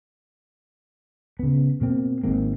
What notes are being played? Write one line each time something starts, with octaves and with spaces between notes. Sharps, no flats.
C#3 B3
B2 A#3 C4
G#1 G#2 A#3 C4